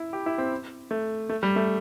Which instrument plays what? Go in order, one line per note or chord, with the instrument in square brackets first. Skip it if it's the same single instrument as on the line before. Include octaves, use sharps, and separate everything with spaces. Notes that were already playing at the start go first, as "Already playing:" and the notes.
Already playing: [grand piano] E4
G4
E4
C4
A3
A3
G3
A3